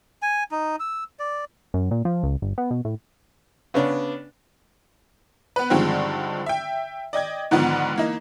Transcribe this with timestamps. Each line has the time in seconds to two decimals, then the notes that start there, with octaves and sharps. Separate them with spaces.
0.22 G#5
0.52 D#4
0.80 E6
1.19 D5
1.74 F#2
1.91 A#2
2.05 F3
2.23 C#2
2.42 G1
2.58 B3
2.71 B2
2.85 A2
3.74 C#3 B3 C#4 D4
5.56 B3 B4
5.70 G2 D3 D#3 F3 G#3 C4
6.46 E5 G5
7.13 D5 D#5 G5 G#6
7.51 G#2 D3 D#3 F3 B3
7.96 E3 A#3 D#4